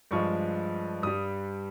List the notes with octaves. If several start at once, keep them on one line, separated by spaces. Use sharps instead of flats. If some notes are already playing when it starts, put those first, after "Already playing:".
G2 F3 G#3 C#6
G2 G3 D#6